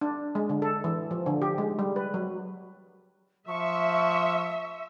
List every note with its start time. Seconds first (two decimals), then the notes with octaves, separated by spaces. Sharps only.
0.01 D4
0.35 G#3
0.49 D3
0.62 A4
0.84 E3
1.11 F3
1.26 D3
1.42 G4
1.58 G#3
1.79 G3
1.96 B4
2.14 F#3
3.48 F3 E5 C#6